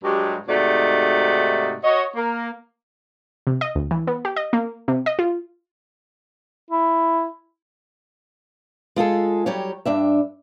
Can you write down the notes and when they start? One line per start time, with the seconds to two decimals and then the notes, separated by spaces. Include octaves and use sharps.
0.03 G2 F#3 G#3 F#4 G4
0.48 G#2 C3 A3 D#4 F#4 D5
1.84 F#4 C#5 D#5
2.15 A#3 A#4
3.47 C3
3.61 D#5
3.75 D2
3.91 E3
4.07 B3
4.25 G4
4.36 D#5
4.53 A#3
4.88 C3
5.06 D#5
5.19 F4
6.71 E4
8.96 G#3 F4 G#4 A4
9.46 F#3 G3 G4 C#5
9.85 G2 D4 E5